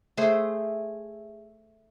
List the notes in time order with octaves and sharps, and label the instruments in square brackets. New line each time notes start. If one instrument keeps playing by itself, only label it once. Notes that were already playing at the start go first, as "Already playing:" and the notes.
[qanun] A3 G#4 C5